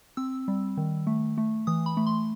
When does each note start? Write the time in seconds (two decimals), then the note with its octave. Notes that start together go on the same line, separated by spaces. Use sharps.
0.17 C4 E6
0.48 G3
0.77 D#3
1.07 A3
1.38 A3
1.67 E3 D#6
1.86 B5
1.97 A3
2.06 C6